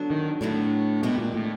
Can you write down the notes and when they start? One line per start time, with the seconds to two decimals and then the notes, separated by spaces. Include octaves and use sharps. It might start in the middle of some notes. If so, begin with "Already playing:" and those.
Already playing: D3 F#3 B3 D4 F#4
0.10 D#3
0.41 A2 D3 F#3 B3 D4 F#4
1.03 B2 D#3 G#3 B3 E4 G4
1.18 A#2
1.34 A2